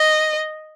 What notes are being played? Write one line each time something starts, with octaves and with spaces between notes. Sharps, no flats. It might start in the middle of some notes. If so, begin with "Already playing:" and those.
Already playing: D#5